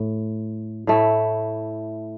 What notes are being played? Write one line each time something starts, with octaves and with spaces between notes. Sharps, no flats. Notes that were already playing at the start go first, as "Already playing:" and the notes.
Already playing: A2
A2 A3 E4